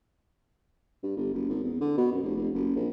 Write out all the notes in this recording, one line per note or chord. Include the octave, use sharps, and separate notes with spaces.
G2
G1
F#1
G#1
E2
D3
B2
F#2
F1
F1
F#1
A#1